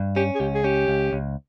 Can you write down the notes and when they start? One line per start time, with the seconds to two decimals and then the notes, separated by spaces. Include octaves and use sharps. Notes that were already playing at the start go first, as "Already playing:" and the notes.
Already playing: G2
0.16 C#4 G4
0.35 G#4
0.40 C#2 G4
0.54 G#4
0.64 C#4 G4
0.88 C#2
1.13 C#2